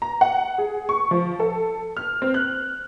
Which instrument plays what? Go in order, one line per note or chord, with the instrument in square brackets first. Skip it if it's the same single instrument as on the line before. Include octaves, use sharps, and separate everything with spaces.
[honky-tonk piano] A#5
F#5
G#4
C#6
F3
A4
F6
C4
F#6